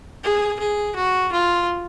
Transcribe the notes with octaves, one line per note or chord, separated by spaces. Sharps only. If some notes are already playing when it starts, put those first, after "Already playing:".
G#4
G#4
F#4
F4